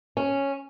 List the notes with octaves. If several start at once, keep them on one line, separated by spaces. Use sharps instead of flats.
C#4